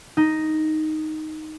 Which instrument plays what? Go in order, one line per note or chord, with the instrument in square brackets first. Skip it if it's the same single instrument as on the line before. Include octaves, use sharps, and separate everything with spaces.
[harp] D#4